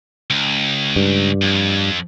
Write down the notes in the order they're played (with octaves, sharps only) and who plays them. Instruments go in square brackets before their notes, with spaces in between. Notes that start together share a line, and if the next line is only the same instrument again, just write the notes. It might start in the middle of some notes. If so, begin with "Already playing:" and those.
[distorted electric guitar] C#2
[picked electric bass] G2
[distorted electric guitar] F2